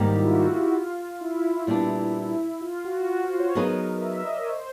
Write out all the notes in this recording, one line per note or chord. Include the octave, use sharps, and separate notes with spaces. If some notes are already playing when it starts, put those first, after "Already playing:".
Already playing: G#2 D#3 G3 A#3 G4
E4
F4
F#4
E4
F4
E4
A#2 G3 B3 D4
F4
F#4
F#4
C5
C#5
F#3 B3 D#4 G#4 A#4 B4
E5
D#5
D5
C#5
C5